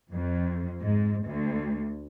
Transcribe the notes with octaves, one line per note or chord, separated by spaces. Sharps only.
F2
G#2
D2